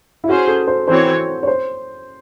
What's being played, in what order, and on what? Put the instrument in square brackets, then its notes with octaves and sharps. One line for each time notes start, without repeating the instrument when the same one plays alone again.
[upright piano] E4
[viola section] C#4 G#4 C5 [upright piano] F#4
[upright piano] A4
C5
[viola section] E3 C4 F#4 C#5 [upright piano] C5
[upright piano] C#5
C5